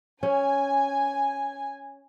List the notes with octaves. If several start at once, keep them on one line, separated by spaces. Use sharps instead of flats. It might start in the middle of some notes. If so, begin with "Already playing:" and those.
C#4 G#5